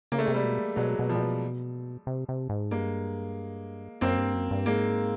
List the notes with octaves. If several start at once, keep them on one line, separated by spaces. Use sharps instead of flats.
C#3 A#3
A3
C3 G#3
G3 A3
B2
B2 F#3 G#3
B2
F3 G3
A#2
B2
C3
C3
G#2
G2 G#3 A#3
F#2 A#3 C4
G2
F#2
G2
G#2 G#3 A#3